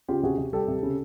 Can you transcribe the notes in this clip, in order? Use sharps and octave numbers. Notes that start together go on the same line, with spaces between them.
C#3 F4 G4
C3 F#4 G#4
C3
G3 G4 A4
C3
C#3